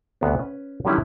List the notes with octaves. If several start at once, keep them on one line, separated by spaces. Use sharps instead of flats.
D2 C3 B3
C#4 B4
D3 D#3 F#3 G3 C#4 E4